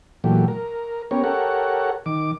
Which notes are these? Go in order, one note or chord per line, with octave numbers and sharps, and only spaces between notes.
A#2 E3 F#3 A3 G4
A#4
B3 C#4 G4 A#4 C#5
G4 A4 A#4 C#5 F#5
D#3 D6